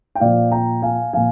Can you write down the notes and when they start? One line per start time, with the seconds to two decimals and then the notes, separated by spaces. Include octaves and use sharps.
0.15 G5
0.20 A#2 F3 D5 F5
0.52 G5 A#5
0.82 F5 G#5
1.13 A#2 F3 F5 G#5